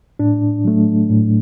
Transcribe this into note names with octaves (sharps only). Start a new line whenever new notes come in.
A2 D4
F#3 A3
A2